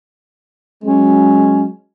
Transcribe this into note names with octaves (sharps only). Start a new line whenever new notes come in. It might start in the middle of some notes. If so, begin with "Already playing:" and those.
F#3 G#3 C#4